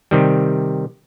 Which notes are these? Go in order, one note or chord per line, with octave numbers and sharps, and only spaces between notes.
C3 D#3 G3